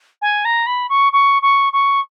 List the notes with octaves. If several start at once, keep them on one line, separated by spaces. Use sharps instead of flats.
G#5
A#5
B5
C#6
C#6
C#6
C#6